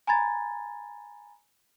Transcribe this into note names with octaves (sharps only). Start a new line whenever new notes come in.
G#5 A#5 B5 G#6 A6